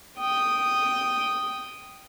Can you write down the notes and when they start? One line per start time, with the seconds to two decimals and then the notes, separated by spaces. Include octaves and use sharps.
0.19 G5 D#6